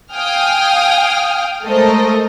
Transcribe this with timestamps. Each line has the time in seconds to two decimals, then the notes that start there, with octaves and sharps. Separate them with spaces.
0.14 F5 G5 G#5 D#6 F6
1.64 G#3 A3 A4 A#4 C5 D#5